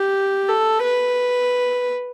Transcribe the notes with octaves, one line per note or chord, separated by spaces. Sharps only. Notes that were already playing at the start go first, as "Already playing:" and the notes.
Already playing: G4
A4
B4